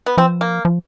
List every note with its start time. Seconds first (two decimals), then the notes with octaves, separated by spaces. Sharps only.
0.06 B3
0.17 F3 C4
0.41 A#3
0.65 F3